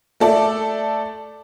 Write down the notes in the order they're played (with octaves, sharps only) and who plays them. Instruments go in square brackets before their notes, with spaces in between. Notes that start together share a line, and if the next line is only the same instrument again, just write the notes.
[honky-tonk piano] A3 A4 D5